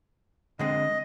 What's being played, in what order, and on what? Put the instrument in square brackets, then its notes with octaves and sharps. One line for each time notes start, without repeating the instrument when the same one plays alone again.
[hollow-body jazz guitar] D3 G#3 C4 [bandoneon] D#5